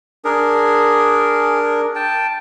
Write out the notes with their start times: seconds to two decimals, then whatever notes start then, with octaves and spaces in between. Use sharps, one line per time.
0.25 D4 G#4 A#4
1.95 G5 A5